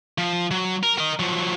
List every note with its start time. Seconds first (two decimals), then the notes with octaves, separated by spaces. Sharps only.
0.18 F3
0.51 F#3
0.83 A#4
0.98 A#4 D#5
1.20 F3 F#3